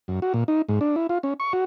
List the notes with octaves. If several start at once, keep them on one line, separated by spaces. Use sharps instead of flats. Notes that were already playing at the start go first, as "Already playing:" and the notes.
F#2
F#4
A#2
D#4
G#2
D4
E4
F4
C#4
C#6
F#4